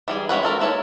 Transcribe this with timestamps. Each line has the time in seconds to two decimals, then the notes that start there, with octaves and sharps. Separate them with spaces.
0.08 E3 G3 G#4
0.29 G#3 C#4 F#4 B4
0.43 F4 A4 A#4
0.60 A#3 E4 A4 C#5